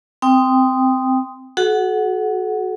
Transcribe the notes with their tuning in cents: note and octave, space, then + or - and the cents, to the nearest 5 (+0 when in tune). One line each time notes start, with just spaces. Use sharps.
C4 -15 G5 +10 D#6 +0
F#4 +0 A4 -45 F#5 +0